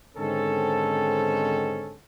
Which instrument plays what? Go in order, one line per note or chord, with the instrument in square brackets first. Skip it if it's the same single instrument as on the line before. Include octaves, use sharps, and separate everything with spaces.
[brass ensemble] G#2 D3 D#3 C4 C#4 A4